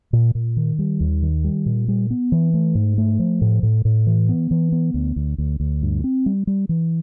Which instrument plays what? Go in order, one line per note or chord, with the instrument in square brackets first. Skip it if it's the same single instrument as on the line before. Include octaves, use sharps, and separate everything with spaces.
[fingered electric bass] A#2
A#2
D#3
G3
D#2
D#3
G3
A#2
G3
B3
E3
A3
G#2
A3
F3
A2
A2
A2
E3
B3
E3
B3
D2
D2
D2
D2
G2
C4
G3
G3
E3